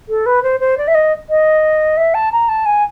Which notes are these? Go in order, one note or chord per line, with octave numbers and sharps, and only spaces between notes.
A4
B4
C5
C5
D5
E5
D#5
D#5
E5
A5
A#5
A5
G#5